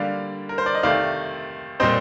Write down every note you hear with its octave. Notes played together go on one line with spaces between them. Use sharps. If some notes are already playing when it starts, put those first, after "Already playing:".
Already playing: D3 G3 A#3 D5 F5
A#4
C5
D5
D#5
C3 D#3 A3 D5 F5
A#2 G3 C4 C5 D#5